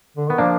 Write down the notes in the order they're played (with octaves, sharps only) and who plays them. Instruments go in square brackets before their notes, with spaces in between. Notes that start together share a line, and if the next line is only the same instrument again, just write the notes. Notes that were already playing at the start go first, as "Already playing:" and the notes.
[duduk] D3
[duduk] D#3 [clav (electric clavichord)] B3
[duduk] F3 [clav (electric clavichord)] A#3 D4